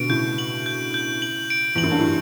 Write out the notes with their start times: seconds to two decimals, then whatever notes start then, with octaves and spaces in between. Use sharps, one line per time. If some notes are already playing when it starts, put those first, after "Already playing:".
Already playing: B2 D3 D7
0.09 A2 C#3 G6
0.38 F#7
0.66 G6
0.94 G6
1.22 F#7
1.50 D7
1.75 E2 F#7
1.83 F#2
1.91 G2
1.99 A2